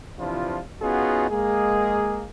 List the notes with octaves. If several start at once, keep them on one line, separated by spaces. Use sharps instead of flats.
C3 E3 F3 D4 E4 F4
B3 C#4 D#4 F4 F#4 G#4
G#3 A#3 G#4